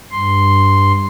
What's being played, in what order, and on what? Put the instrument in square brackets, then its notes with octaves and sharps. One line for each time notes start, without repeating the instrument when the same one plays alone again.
[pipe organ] G2 C6